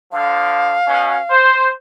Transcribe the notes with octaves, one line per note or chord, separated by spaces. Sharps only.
D3 F3 F5
B2 C#4
C5